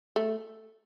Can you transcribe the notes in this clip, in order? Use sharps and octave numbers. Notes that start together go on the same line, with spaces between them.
A3